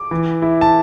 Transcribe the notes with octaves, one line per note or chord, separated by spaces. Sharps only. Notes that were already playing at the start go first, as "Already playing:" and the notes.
Already playing: D6
E3
E4
A5